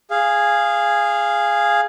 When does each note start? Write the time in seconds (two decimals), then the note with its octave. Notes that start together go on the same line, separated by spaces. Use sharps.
0.11 G#4 F5